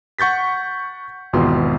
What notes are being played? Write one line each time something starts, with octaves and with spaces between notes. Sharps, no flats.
F#5 C#6 G6 A6 B6
G#1 E2 B2 F4 G5 C6